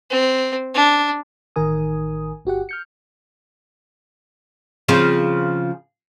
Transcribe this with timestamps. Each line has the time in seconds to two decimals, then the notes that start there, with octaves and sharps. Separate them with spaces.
0.11 C4
0.75 D4
1.56 A1 D#3 A#4 G#5 D#6
2.45 G1 F#4 G4 F#5
2.69 F6 G6 C#7
4.88 C#3 F3 C4